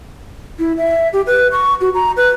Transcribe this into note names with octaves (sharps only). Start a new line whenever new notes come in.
E4
E5
G4
B4
C#6
F#4
A#5
B4